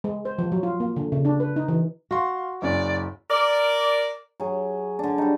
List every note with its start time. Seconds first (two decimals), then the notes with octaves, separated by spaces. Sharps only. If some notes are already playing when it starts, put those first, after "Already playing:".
0.04 G#3
0.25 C5
0.38 F3
0.52 F#3
0.63 F4
0.80 A#3
0.96 D3
1.12 C#3
1.25 D4
1.40 B4
1.56 D#4
1.68 E3
2.11 F#4 F5 C6
2.62 F#1 C#4 D5
3.31 A#4 D5
4.40 F#3 G#4
4.99 D3 D4
5.18 G3 D#4